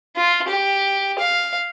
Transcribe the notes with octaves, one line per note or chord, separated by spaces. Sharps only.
F4
G4
F5